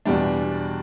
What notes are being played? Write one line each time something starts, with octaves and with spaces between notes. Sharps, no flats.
E2 B2 G3 D4